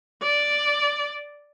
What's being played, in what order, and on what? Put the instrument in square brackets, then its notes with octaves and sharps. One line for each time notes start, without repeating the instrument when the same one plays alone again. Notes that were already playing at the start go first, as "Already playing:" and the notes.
[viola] D5